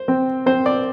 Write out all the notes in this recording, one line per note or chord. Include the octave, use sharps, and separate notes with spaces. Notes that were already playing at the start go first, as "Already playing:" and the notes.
Already playing: C5
C4
C4 C5
D5